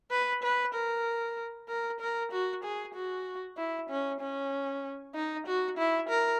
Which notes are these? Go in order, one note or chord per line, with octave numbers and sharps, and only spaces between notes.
B4
B4
A#4
A#4
A#4
F#4
G#4
F#4
E4
C#4
C#4
D#4
F#4
E4
A#4